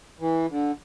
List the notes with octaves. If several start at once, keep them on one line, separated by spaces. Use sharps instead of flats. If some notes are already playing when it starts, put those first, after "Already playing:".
E3
D3